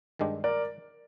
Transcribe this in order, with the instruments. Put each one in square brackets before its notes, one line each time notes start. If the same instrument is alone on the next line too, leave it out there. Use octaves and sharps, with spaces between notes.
[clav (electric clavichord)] G2 D#3 G#3 D4 G4
[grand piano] A#4 D5